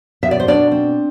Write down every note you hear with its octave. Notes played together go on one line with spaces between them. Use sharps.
B2 E5
D5
C5
B2 D4 D5
C4